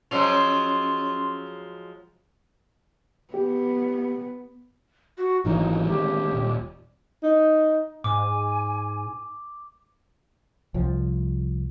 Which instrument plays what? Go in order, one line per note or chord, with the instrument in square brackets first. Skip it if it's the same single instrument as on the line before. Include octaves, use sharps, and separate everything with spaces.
[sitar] F3 F#3 G#3 [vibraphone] C#4 C6 E6
[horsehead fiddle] B3 [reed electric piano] G4
[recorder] F#4
[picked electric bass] G#1 E3 F#3 [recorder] D#4
[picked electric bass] D3 D#3 G#3 [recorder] G4
[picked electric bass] D#1
[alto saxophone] D#4
[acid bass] G#2 [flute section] G#5 [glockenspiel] D6
[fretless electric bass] C2 F3